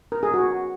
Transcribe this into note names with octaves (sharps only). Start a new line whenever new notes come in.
A#4
G#4
F#4